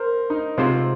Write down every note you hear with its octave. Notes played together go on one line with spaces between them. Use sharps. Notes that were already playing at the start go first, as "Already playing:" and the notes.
Already playing: A#4 C5
D#4
C3 G#3 C4 F4 C5